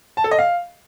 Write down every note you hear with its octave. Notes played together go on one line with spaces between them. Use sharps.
A5
A4
D#5
F5